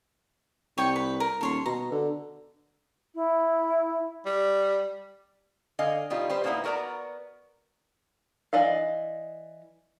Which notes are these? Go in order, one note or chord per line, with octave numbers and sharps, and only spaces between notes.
C2 C#5 G5 C#6
B4
A#4
D#1 A4 C#5 C6
B2 A#5
D3
E4
G3
D3 D#5 F5 G#5
B2 G3 D#4 F4
G3 B4 C5
A#2 C#3 A#3 B3 D#4 E4
B3 F#4 A#4 D5 A#5
E3 D5 D#5 F5